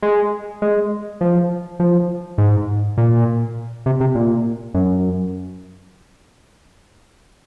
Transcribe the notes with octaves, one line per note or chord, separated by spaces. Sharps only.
G#3
G#3
F3
F3
G#2
A#2
C3
C3
A#2
F#2